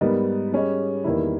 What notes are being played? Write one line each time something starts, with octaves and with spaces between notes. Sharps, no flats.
G#2 G3 B3 D#4 A#4
G3 C#4 G#4 D#5
E2 D#3 G3 A#3 E4